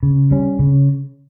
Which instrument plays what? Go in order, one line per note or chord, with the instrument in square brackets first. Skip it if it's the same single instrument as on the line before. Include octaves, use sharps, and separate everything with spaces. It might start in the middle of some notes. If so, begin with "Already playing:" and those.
[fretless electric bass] C#3
G3 C#4
C#3